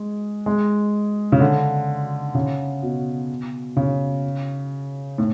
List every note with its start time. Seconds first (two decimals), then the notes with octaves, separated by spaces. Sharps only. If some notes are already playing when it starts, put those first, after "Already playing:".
Already playing: G#3
0.46 G#3
1.32 C#3
1.40 D3
2.35 C#3
2.82 B2
3.76 C#3
5.18 A2